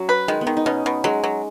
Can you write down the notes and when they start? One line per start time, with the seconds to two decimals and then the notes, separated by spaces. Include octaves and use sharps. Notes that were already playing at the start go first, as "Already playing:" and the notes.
Already playing: F#3 C#4
0.09 B4
0.28 D#3 G#3
0.41 B3
0.47 D#3
0.57 D#4
0.66 B2 C#4
0.86 B2
1.04 F#3 G#3
1.24 F#3